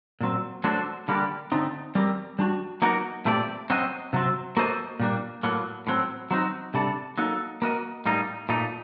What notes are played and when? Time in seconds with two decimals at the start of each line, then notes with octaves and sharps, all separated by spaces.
0.21 A#2 F#3 C4
0.64 F#3 A3 D4 A4 C5
1.08 D3 G3 A#3 D4 G4
1.52 D3 A3 C4 D#4
1.95 G3 C4 G4 A#4
2.39 G3 D4 F#4
2.82 F#3 A#3 D#4 F#4 A#4
3.25 A#2 A3 C4 G4 D5
3.70 F#3 C4 F#4 C5 D#5
4.13 C3 F#3 C4
4.57 A#3 F#4 A4 C5 D#5
5.00 A#2 G3 A#3 D4
5.43 A2 F#3 A#3
5.87 A2 F#3 C4
6.31 F#3 C4 D#4 F#4
6.74 C3 G3 D4 A4
7.18 F#3 A#3 D#4 A4
7.62 A#3 F#4 A#4 D#5
8.06 A2 G3 A#3 D#4
8.49 A#2 A3 D#4